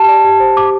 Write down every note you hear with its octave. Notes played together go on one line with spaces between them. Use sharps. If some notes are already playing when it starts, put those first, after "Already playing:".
Already playing: G4 A5
D5
G4
C5
G4 D6